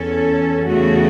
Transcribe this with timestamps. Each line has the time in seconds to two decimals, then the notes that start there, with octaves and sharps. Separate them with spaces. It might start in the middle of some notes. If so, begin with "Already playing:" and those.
Already playing: E2 E3 C#4 A4
0.68 E2 C#3 A3 F#4